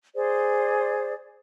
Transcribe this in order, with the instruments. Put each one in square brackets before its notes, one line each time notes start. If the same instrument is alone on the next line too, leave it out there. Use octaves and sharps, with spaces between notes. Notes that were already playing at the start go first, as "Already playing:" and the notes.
[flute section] G#4 C5 D5